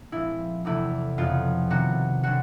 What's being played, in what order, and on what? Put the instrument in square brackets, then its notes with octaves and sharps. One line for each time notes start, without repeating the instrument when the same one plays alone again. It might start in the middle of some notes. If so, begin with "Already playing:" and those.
Already playing: [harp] A#3
A#2 F3 G#3 C4 E4
E2 C3 E3 A3 E4
F2 C#3 F#3 B3 F4
C3 D#3 F#3 B3 F#4
D3 F#3 F#4